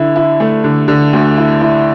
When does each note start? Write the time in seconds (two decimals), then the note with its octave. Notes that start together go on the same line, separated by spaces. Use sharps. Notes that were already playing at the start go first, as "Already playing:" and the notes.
Already playing: D3 E4
0.16 E4
0.40 A3
0.64 D3
0.88 D3
1.13 D2
1.37 E4
1.61 E4